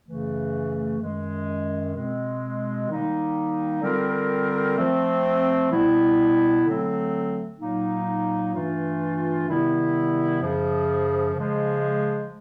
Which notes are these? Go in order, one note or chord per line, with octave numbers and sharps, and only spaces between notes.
F#2 C#3 E3 A3
F#2 D#3 G#3
B2 G#3 C4
D#3 G3 A#3 D#4
D3 G3 C4 F4 A#4
F3 A3 C4
B2 G3 B3 E4
D3 F#3 A3 C4
A#2 F#3 A#3 D#4
G2 E3 A3 D4 F4
C3 D#3 G3 B3 E4
F#2 C#3 F3
C#3 F3 G#3